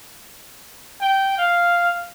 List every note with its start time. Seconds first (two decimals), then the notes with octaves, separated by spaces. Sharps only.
1.01 G5
1.38 F5